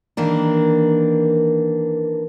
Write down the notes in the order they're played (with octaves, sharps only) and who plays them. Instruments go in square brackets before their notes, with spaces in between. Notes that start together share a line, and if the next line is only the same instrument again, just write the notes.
[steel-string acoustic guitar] D#3 E3 A#3 D4